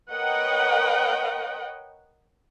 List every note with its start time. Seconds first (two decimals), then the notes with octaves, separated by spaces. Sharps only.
0.12 A#4 B4 C#5 D#5 F#5 G5